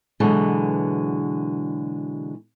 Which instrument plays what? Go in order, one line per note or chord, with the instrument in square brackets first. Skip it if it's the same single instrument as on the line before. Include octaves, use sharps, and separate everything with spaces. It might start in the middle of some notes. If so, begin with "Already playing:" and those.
[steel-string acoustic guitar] B2 D3 E3 F#3 G#3